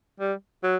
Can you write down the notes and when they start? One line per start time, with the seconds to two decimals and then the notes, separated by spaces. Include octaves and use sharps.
0.20 G3
0.63 F#3